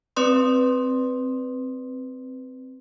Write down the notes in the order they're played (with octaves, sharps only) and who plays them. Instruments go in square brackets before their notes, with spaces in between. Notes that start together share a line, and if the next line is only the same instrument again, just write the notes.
[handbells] C4 B4 D5 C6 D#6